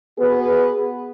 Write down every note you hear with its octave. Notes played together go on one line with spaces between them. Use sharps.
B3 F#4 G#4 B4